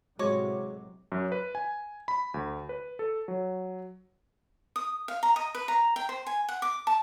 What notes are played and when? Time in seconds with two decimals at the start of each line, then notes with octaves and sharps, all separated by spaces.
0.19 A2 C3 F#3 G#3 F#4 G#4 C#5 D6
1.12 F#2
1.32 B4
1.55 G#5
2.08 B5
2.34 D2
2.69 B4
2.99 A4
3.28 F#3
4.76 D#6
5.08 F5
5.23 A#5
5.36 D#5
5.55 B4
5.68 A#5
5.96 G5
6.09 C5
6.26 G#5
6.49 F#5
6.62 D6
6.87 A5